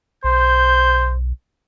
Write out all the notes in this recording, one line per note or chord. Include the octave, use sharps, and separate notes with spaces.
B1 C5 G6